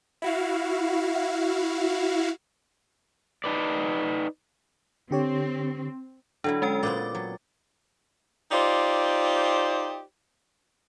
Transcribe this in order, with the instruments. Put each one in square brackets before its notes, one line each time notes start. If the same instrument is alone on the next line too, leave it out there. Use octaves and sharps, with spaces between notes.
[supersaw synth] E4 F#4 F5
[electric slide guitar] D#4 B4 D5
[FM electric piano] D3 G4 C#5 [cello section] C4
[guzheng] D3 F#3 E4 [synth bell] D4
[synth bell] G#3 C#4 G5
[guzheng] A#2 B3 C4 [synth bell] D6 A6
[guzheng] F#3
[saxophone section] D#4 F4 G4 C5 D5